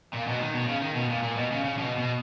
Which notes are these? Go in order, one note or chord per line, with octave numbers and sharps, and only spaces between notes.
A#2
B2
D#3
B2
C#3
D#3
B2
A#2
A#2
B2
C#3
C#3
B2
B2